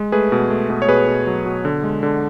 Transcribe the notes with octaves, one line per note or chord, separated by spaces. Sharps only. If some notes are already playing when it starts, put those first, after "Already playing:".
Already playing: G#3
A3 G#4 B4
B2
A3
B2
C#5
B2 G#4 B4
B2
F#3
B2
D3
G#3
D3